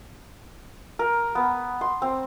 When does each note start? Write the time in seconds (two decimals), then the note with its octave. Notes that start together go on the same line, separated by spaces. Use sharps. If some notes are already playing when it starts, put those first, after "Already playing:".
0.99 A#4
1.35 B3
1.81 C6
2.02 C4